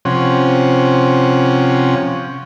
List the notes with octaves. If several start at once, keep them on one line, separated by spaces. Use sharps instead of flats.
C3 F3 C#4 F#5